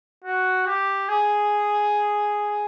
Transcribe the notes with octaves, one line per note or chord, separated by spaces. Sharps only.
F#4
G4
G#4